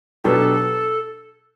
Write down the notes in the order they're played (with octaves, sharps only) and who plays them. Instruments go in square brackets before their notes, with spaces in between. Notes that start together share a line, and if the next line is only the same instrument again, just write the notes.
[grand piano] B2 F#3 B3 D4 G4 [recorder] A4